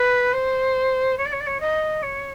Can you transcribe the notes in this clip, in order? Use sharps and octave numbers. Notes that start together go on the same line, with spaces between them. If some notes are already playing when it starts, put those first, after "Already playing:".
Already playing: B4
C5
C#5
D5
C#5
D5
C#5
D#5
C#5